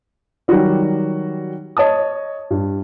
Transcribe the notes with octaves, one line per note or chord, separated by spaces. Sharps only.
D#3 F#3 G3 F#4 D5
C#5 D#5 A5 D#6
G2